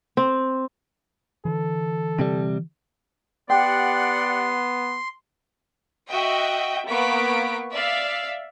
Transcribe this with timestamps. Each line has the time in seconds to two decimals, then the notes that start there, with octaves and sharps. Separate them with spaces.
0.17 C4
1.45 D3 E3 A4
2.19 C3 G3
3.50 B3 G4 D5 F#5 G5 C6
6.10 F#4 D#5 E5 G5
6.87 A#3 B3 C#6 B6 D7
7.72 D5 E5 F5